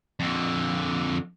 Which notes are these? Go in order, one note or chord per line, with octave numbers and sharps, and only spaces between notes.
F2 D3